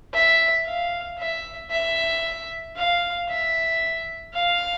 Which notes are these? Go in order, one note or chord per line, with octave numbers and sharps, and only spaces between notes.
E5
F5
E5
E5
F5
E5
F5